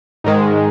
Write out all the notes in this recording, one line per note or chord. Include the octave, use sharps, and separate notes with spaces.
G#2 D#3 G#3